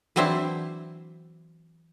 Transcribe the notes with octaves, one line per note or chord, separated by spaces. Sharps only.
E3 F#3 C4 D4 E4 C5